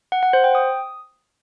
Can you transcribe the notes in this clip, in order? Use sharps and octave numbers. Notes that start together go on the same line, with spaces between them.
F#5
F#5
C5
G5
D#6